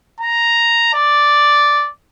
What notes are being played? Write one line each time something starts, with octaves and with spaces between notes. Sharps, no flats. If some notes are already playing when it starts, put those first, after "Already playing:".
A#5
D5